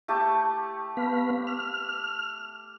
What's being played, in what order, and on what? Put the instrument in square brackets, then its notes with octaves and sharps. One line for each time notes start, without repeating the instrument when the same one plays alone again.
[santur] A3 G4 A5
[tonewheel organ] B3 F5 B5
F6